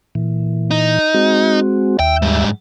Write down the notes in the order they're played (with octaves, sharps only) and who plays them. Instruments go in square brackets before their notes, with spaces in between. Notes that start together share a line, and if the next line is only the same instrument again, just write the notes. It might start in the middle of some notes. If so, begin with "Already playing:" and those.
[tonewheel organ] A#2 E3
[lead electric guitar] D#4
[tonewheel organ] G#3 C4 F#4
[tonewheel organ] D#2 E5 [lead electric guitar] G5
[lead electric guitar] G#2 G3